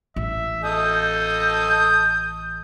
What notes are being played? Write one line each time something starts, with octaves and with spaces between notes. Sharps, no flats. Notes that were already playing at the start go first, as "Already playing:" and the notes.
A1 E5
A4 D#5 D#6 G6